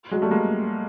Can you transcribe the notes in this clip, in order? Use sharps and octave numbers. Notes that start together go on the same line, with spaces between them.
F#3 G#3
G3 A3
G#3 A#3